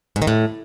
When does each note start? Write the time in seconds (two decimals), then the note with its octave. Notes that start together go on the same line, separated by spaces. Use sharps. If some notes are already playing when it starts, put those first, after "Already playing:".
0.16 G#2
0.22 D#3
0.27 A2